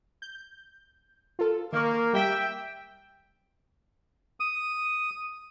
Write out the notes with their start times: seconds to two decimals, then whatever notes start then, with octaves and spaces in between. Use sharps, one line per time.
0.22 G6
1.39 F4 A4
1.73 D#3 A#3 C#6
2.13 G3 E5 G5 B6 D7
4.40 D#6